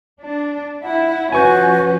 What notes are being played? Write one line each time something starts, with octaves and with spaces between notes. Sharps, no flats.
D4
E4 F#5
F3 C#4 F#4 B4 G#5 C#6 G6